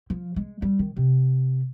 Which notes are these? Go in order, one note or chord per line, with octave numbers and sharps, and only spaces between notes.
F3
G#3
G3
D#3
C3